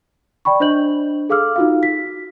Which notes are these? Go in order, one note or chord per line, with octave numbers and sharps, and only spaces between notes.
D5 G5 B5 C#6
D4 C5 D#5 G6 F#7
G#4 A4 F5 D6 E6 F6
D#4 F4 F#4 G#4 F5
B6